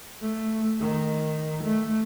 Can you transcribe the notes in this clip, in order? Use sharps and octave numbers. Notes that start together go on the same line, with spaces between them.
A3
D#3
A3